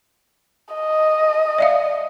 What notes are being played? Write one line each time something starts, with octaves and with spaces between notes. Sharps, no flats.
D#5
D5 E5 F5